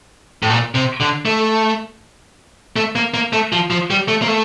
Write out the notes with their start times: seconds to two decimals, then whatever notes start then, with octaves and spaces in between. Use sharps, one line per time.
0.43 A2
0.50 A#2
0.75 C3
1.00 D3
1.25 A3
2.76 A3
2.95 A#3
3.14 A#3
3.33 A3
3.52 F3
3.70 F3
3.90 G3
4.08 A3
4.22 A#3
4.28 A3